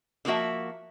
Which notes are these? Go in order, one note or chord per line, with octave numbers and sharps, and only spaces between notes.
D3 F3 A#3 F#4 E5